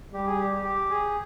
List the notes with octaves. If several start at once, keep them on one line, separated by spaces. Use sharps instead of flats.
G3 G4
G#4
G4
G4
G4
G#4